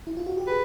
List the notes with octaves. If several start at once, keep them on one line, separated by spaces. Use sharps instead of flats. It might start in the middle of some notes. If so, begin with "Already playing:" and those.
E4
F4
F#4
G4
G#4 B4